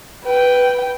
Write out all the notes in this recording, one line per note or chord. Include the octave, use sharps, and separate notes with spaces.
B4 G5